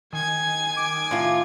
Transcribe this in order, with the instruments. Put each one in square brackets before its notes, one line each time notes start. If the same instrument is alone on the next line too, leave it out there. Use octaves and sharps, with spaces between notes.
[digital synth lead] D#3 [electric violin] G#5 G#6
[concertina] D6
[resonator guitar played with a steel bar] A2 F4